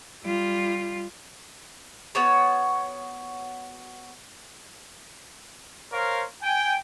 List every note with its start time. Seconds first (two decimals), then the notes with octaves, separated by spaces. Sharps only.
0.24 G3 F4
2.15 B3 F#4 C#5
5.93 A#4 C5 C#5 F5
6.42 G5 G#5